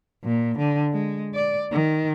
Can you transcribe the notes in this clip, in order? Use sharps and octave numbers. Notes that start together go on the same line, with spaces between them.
A#2
D3
G#3
D5
D#3